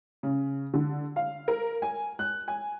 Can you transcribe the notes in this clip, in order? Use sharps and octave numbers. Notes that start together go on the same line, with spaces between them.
C#3
D3
F5
A#4
G#5
F#6
G#5